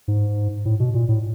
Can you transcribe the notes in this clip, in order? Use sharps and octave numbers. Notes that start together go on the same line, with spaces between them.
G#2
A2
B2
A#2
A2